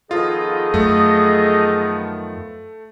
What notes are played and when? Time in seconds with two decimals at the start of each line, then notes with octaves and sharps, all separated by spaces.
0.11 D#3 F3 B3 F4 G#4 A4 D#5
0.74 F#2 A3